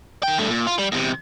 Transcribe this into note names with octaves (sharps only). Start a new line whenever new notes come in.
D#3 G5
G2 A3
A#2
F4
G3
E2 C3